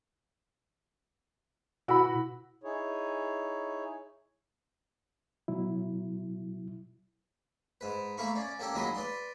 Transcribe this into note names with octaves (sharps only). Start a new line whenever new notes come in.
B2 E4 F#4 B5 E6
D#4 E4 G#4 C#5
B2 F#3 E4
G#2 B4
A3 A#3 F5 B5 C#6
C#4 D5
A#3 C#4 G4 A4
D#2 F#3 G#3 F4 D#5 B5
B4 D5 C6